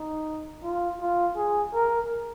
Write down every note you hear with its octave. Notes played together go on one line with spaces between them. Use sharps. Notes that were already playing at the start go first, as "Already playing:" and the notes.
Already playing: D#4
F4
F4
G#4
A#4